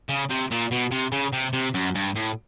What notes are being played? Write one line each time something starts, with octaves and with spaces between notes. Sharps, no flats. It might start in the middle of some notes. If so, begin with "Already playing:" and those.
C#3
C3
A#2
B2
C3
C#3
C3
C3
F#2
G2
A2